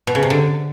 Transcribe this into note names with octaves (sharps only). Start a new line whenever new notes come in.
B2
C#3
C3
D3